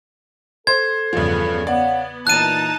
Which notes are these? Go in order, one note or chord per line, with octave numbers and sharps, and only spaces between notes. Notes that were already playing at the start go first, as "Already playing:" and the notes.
A4 C5 G#6
E2 G2 C#3 F3 B3
B3 C#5 D5 F5 F#5
A#2 E3 D#4 A5 F#6 D#7